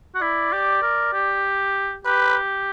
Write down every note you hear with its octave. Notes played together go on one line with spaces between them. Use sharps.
F#4
E4 D5
G4
A#4
G4
G4 B4